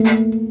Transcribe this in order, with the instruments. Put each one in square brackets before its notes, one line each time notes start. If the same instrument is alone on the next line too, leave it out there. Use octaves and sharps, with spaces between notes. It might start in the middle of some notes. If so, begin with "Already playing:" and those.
Already playing: [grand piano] A3 A#3